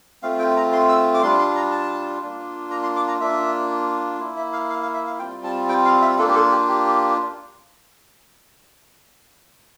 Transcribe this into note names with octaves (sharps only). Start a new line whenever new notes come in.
A3 C4 F4 F5
G5
A#5
C6
E6
D6
G3 D4 F4 C6
C6
A#5
A5
A#3 D4 F4
A#5
C6
D6
A#5
A#3 D4 F4 E5
A#3 E4
E5
F5
F5
F5
E5
F5
G3 C4 F4 G5
A5
G5
F5
E5
A#3 D4 F4 A4
G4
A4
G4
G4